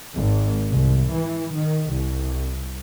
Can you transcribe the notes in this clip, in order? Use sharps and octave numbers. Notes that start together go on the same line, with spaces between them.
G#1
C2
E3
D#3
C2